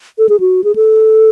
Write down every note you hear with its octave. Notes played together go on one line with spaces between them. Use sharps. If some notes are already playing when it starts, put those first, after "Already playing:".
A4
G#4
F#4
G#4
A4